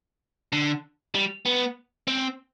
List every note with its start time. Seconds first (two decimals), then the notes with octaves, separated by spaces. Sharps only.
0.53 D3
1.15 G3
1.46 B3
2.08 C4